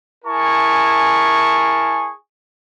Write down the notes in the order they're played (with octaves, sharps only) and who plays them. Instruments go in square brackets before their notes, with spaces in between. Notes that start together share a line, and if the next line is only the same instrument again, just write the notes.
[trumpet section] E4 G#4 A#4 G#5 A5 C#6